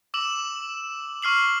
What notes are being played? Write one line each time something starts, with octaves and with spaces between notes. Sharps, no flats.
D6 E6 E7 F#7
C#6 F6 C7 F#7